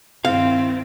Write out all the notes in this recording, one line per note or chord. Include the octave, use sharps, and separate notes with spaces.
G2 D#3 C4 E4 F5